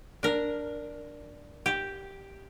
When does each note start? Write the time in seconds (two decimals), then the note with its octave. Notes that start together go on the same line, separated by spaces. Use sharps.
0.23 D4 A#4
1.66 G4